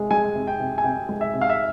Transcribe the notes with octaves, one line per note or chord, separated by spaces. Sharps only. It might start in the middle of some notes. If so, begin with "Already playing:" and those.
Already playing: C3 G#3
G#3 G#5
C3
G5
C3
G#5
C3 G5
G#3
E5
C3
F5
E5